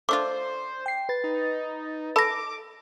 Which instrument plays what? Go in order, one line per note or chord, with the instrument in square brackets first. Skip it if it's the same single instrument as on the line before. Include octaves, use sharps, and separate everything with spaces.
[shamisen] A3 D4 F4 [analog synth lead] C5 [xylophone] D6
[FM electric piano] G5 C7
B4 A6
[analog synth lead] D#4
[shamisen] A4 G#5 A5 [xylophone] B5 A#6 [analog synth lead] D6